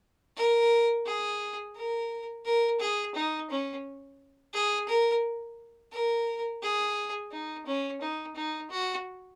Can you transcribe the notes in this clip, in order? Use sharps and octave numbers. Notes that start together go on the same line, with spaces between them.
A#4
G#4
A#4
A#4
G#4
D#4
C#4
G#4
A#4
A#4
G#4
D#4
C#4
D#4
D#4
F#4